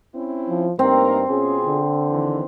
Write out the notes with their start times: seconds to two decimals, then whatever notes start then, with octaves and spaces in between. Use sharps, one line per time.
0.15 C4 C#4 E4
0.49 F3
0.79 G2 A#3 C4 D#4 A#4
1.29 B2 C#4 F4 G#4
1.67 D3
2.10 D#2 D#3 E3